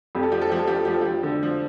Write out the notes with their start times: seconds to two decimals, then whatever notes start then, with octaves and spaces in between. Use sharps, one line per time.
0.15 F2 G4
0.23 A4
0.32 F3 G4
0.42 A4
0.50 F3 G4
0.59 A4
0.67 F3 G4
0.76 A4
0.85 F3 G4
0.94 A4
1.01 F3 G4
1.23 D3
1.43 F3